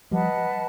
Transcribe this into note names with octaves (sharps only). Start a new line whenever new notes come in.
F3 G3 B4 D#5 F#5 A5